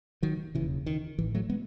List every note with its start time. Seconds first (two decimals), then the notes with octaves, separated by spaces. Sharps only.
0.23 D#3 F#3
0.55 E1 D#2 C#3 E3
0.86 D#3
1.19 A1 A2 E3
1.35 F#3 A3
1.50 G#3 B3